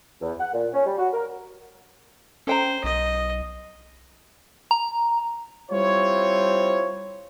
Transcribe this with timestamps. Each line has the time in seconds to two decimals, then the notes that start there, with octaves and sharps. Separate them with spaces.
0.21 E2
0.39 F#5
0.53 A#2
0.73 C#4
0.85 G3
0.98 F#4
1.13 A#4
2.47 C#4 A4 C5 G5 A#5
2.84 B1 D#5
4.71 A#5
5.71 G3 C4 E4 F4 C5 C#5